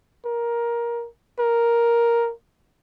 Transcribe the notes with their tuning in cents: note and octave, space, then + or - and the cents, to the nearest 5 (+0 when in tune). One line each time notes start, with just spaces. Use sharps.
A#4 +15
A#4 +5